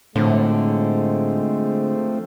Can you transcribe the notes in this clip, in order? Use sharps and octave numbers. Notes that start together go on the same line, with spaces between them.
A2 D3 F3 G#3 A3 C4